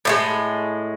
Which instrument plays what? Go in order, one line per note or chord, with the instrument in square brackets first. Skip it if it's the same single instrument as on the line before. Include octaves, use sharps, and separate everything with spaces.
[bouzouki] A2 E3 G#3